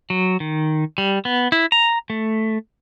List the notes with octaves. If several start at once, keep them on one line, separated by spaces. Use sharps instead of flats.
F#3
D#3
G3
B3
E4
A#5
A3